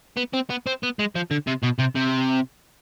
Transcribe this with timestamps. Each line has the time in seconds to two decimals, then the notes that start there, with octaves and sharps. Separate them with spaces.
0.17 B3
0.34 C4
0.50 B3
0.67 C4
0.83 B3
0.99 G#3
1.15 F3
1.31 D3
1.47 C3
1.63 B2
1.79 C3
1.96 C3